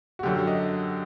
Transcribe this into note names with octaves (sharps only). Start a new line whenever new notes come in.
F#4
F#2 D3 F#3 G4
D#5